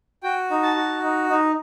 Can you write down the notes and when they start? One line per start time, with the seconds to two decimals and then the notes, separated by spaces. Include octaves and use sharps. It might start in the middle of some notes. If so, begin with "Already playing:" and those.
0.23 F#4 G5
0.51 D#4
0.63 A5
0.77 F#4
1.03 D#4
1.30 D#4